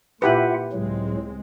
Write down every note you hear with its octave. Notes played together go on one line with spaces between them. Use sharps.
A#2 E4 F4 G4 B4 E5 F#5
C#2 A2 F#3 G#3 C4